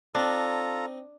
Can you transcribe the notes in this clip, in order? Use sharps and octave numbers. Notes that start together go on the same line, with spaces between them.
C4 D4 D#4 F4 A4 A#5